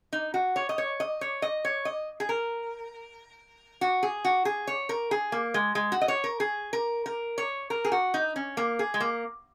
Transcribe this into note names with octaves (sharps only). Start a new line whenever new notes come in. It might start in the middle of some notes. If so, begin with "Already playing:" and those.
D#4
F#4
C#5
D#5
C#5
D#5
C#5
D#5
C#5
D#5
G#4
A#4
F#4
G#4
F#4
G#4
C#5
A#4
G#4
A#3
G#3
G#3
F#4
D#5
C#5
A#4
G#4
A#4
A#4
C#5
A#4
G#4
F#4
D#4
C#4
A#3
G#4
G#3
A#3